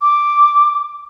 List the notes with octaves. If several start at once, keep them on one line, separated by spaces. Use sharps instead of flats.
D6